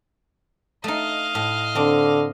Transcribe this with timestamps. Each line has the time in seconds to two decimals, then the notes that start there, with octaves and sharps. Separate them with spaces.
0.84 A3 D#4 D#5 F5
1.35 A2
1.75 D3 C4 D4